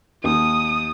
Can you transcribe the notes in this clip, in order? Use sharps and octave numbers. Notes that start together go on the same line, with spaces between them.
D#2 D#6